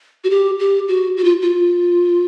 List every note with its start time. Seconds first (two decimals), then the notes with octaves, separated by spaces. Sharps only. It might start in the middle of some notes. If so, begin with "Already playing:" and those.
0.24 F#4
0.30 G4
0.59 G4
0.88 F#4
1.17 F#4
1.24 F4
1.42 F4